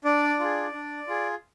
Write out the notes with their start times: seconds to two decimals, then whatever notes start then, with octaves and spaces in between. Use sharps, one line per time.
0.05 D4 D5
0.40 F4 G#4
0.73 D4
1.08 F4 G#4